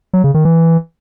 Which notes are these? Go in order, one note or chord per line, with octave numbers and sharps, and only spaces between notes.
F#3
C#3
D#3
E3